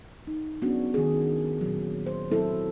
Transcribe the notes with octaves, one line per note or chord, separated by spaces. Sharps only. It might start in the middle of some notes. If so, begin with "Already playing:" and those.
D#4
F#3 B3 C#4 D4 F#4
D#3 G#4
A#2 F#3
C5
F#3 C4 E4 A4